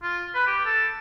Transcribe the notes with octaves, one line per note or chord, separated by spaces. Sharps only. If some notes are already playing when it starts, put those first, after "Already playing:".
F4
B4
G4
A4